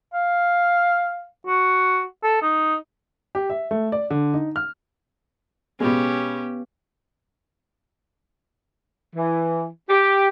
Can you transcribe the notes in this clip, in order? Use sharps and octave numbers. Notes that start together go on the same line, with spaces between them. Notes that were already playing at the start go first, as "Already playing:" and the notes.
F5
F#4
A4
D#4
G4
E5
A3
D5
D3
D#4
F6
B2 G#3 B3 C#4 G4
E3
G4